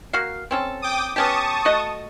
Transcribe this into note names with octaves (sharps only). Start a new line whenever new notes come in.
A#3 F#4 F5
C4 C#4 A4
G5 D6 D#6
B3 C#4 G4 A5 C#6 D#6
A3 F#4 D#5